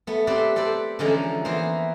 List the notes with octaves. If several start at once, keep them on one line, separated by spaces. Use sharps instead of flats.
A3 B3
C4 G4 A4 B4 D5
A4 B4 C5 D5
D3 E3 F3 G#3 C#4 D#4
E3 A#3 B3 C5